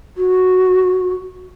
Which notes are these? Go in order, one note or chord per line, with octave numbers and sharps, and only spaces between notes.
F#4